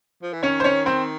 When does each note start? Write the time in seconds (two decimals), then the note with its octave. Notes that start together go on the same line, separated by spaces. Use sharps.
0.23 F3
0.33 E3
0.43 D#3 C#4 C#5
0.60 C5
0.64 C#4 C#5
0.86 C4 C5